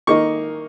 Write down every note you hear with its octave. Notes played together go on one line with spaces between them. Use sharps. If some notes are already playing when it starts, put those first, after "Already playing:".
D#3 A#3 D#4 C#6